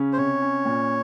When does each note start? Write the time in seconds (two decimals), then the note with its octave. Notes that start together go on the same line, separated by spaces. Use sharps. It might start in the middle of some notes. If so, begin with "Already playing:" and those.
Already playing: C#3 C#4
0.13 C5
0.17 C3 C#5
0.42 C#4
0.65 A#2